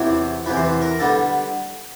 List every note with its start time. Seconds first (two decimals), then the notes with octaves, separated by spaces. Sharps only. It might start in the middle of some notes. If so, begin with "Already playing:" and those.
Already playing: E2 C3 E3 C#5
0.46 E2 C3 E3 B4
0.56 C5
0.65 B4
0.81 A#4
0.99 D3 G3 B3 A4